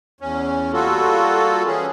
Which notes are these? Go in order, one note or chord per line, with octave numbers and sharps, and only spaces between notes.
E2 C#4
G3 A#3 F4 F#4 A4
E3 C#4 G#4